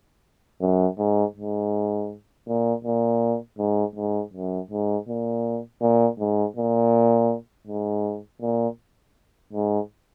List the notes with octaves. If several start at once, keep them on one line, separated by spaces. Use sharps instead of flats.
F#2
G#2
G#2
A#2
A#2
G#2
G#2
F#2
G#2
A#2
A#2
G#2
A#2
G#2
A#2
G#2